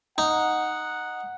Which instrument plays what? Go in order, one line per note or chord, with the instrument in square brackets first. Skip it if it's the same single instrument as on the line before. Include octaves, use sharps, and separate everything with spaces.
[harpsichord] D#4 [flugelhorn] F#5